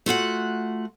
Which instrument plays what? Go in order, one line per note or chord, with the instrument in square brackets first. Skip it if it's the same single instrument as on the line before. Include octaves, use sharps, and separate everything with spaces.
[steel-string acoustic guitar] A3 F4 F#4 F#5